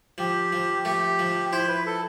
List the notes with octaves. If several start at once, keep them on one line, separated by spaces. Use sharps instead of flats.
F3 G4
F3
A3 G4
F3
E4 C5
B4
A4